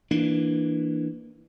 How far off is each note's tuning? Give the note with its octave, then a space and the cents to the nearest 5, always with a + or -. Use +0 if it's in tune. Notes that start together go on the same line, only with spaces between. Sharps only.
E3 +0 A#3 +0 D4 +10